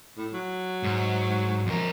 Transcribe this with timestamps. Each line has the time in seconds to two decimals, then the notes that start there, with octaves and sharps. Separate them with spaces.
0.17 A2
0.33 F#3
0.83 G#2
1.66 F2 A#4